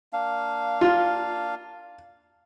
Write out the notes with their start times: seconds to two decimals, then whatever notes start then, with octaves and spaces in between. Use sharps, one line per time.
0.13 A#3 D4 F5
0.81 F4